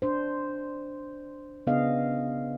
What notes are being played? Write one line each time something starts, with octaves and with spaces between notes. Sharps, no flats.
D4 C5
C#3 B3 D4 G#4 D#5 F5